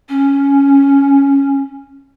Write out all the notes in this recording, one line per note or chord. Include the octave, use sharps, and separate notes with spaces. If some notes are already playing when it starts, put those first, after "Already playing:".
C#4